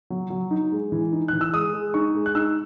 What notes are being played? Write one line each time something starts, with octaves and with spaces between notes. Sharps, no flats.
F#3
F#3
D#4
G#3
E3
D#4
E3 F#6
E6
G#3 D#6
G#3
D#4 C#6
G#3
F#6
D#4 E6